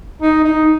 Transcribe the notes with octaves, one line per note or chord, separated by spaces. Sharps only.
D#4
D#4